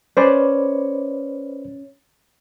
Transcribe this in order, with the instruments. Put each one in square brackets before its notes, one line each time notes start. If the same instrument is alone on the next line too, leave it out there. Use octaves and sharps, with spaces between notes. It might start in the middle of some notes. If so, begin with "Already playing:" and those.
[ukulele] C#4 [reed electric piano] B4 C5 D5